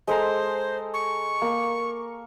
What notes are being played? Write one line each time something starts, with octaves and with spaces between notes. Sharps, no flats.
G#3 A4 C5 A#5
C#6
A#3